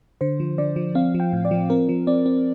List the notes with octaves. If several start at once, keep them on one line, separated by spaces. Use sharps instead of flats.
D3 C5
F3
D3 D5
F3
C4 F5
F3
G5
A2
D5
F3
C4 A#4
F3
C4 D5
C4